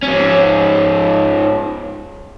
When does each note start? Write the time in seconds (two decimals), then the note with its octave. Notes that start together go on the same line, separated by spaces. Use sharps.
0.03 G#2 C#4